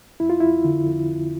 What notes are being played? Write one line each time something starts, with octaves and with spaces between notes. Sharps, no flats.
F2 E4
F4
F2 E4
D3
F2
F2